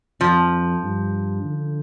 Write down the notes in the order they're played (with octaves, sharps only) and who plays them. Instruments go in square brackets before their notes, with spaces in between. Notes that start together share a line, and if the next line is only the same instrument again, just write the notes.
[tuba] F2 [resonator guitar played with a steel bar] F3
[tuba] G2
D3